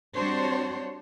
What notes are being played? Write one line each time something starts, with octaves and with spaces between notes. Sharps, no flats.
G3 C4 D4 F#4 C5 C#5